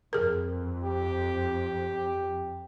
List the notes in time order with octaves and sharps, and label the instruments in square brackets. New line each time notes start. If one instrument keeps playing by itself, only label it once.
[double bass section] F2 [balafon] G#4 A#4
[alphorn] G4